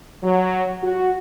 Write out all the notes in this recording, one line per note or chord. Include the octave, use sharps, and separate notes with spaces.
F#3
F#4